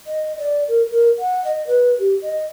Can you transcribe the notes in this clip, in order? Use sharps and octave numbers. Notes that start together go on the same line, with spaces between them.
D#5
D5
A#4
A#4
F#5
D#5
B4
G4
D#5